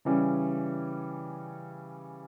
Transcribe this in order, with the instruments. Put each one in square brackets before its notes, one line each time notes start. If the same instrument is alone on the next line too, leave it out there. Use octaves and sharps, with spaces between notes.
[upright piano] C#3 E3 G3 C#4